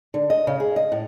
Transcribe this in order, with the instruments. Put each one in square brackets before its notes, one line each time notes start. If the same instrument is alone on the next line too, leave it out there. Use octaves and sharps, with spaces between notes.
[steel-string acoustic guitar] D3
D#5
C#3
G#4
D#5
A2